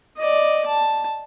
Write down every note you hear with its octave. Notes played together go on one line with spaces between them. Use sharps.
D5 D#5
A5